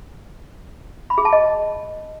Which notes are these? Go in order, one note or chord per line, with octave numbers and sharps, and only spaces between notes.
B5
G#4
A5
D#5